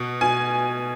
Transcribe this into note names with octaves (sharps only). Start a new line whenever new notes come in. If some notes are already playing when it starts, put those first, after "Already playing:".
Already playing: B2
B2 G#5